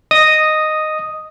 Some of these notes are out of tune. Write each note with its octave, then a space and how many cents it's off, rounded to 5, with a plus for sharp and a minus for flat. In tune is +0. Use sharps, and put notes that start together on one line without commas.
D#5 -10 D#6 +0